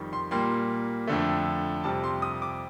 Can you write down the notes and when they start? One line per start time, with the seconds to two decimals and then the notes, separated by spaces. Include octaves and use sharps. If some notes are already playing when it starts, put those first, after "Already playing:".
Already playing: F2 D#3 G3
0.13 C6
0.31 A#2 G3 A#3 C6
1.07 F2 D3 A3
1.84 F2 C3 G3 A5
2.04 C6
2.22 D#6
2.42 D6